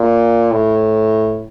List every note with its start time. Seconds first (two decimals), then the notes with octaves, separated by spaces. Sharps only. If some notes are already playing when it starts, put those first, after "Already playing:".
Already playing: A#2
0.52 A2